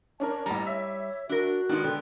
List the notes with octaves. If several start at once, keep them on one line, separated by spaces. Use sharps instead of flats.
C#4 D4 A#4 A5
A1 G3 A#5
C#5 E5
D4 F#4 A#4
D#3 G#3 B3 D4
D3 G5